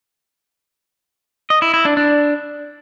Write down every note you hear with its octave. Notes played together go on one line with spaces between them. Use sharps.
D#5
E4
E4
D4
D4